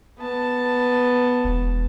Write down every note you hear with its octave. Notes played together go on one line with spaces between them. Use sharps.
B3 A5
E1